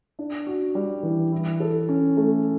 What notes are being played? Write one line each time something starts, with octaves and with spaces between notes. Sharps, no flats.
D4
F#4
G3
E3
E4
A4
C#4
A3